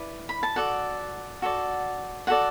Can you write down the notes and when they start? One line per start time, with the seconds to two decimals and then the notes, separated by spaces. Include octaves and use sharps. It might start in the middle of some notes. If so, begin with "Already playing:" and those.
Already playing: E4 B4 D5
0.29 B5
0.43 A5
0.56 F#4 A4 D5 F#5
1.42 F#4 A4 D5
2.27 F#4 A4 D5 F#5